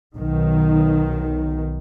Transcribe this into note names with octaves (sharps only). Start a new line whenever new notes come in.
B1 D#3